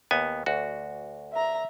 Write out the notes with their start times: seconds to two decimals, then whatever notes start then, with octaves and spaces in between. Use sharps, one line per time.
0.11 D#2 B3 G#5
0.46 D2 F#4
1.33 E5 A#5